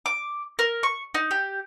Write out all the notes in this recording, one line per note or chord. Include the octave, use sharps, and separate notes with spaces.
D6
A#4
C#6
D#4
G4